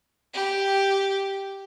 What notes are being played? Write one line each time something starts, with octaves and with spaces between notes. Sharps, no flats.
G4